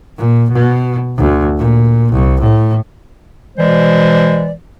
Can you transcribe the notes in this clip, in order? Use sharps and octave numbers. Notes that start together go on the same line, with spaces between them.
A#2
B2
D2
A#2
C2
A2
B2 E3 G#3 C5 D5